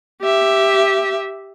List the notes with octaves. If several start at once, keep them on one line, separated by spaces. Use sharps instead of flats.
G4 E5